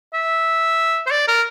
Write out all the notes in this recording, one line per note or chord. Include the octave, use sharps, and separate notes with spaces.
E5
C5
D5
A#4